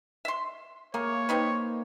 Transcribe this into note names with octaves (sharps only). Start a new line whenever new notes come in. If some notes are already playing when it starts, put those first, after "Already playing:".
E5 C6
A#3 G#4 C#5
C4 D#4 B4